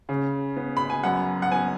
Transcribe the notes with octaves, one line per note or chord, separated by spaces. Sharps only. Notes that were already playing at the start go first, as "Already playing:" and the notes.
C#3
B3
B5
G#5
F#2 F#5
F#5
B3 G#5